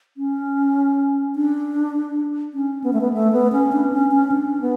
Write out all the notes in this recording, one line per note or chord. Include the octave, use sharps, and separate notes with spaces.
C#4
D4
C#4
B3
A3
B3
A3
B3
C#4
D4
C#4
C#4
D4
B3